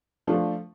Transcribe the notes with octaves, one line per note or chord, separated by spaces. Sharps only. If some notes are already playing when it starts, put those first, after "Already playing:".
F3 A3 D4 F4